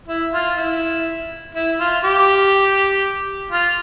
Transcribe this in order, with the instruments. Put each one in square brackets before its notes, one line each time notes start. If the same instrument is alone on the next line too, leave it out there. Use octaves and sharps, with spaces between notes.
[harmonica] E4
F4
E4
E4
F4
G4
F4